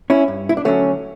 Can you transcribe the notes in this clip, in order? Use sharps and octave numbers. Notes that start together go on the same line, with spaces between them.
C#4 E4
G2
E4
D4
D3 F#3 A3 C#4